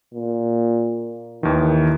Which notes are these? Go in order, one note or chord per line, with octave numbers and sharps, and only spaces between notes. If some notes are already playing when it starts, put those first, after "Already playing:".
A#2
D#2 D#3 E3